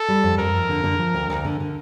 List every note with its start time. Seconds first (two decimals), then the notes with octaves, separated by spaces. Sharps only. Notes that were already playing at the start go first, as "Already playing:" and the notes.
Already playing: A4
0.08 G3
0.23 F2
0.38 F2 A#4
0.53 F2
0.69 D3
0.84 D3
0.99 F3
1.14 D2
1.30 D2
1.45 D3
1.60 D3